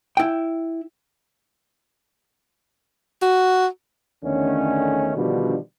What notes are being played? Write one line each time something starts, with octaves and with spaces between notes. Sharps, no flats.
E4 G5
F#4
E2 D3 D#3 A3 C#4
B2 D3 D#3 F3 G3 D4